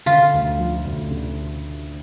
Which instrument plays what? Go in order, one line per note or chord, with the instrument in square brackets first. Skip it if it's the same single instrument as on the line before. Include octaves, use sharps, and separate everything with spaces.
[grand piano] D3 [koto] F4
[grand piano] D2
F3
D2
D3